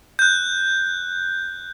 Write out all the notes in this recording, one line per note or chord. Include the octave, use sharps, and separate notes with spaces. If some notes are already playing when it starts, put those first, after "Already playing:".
F#6 G6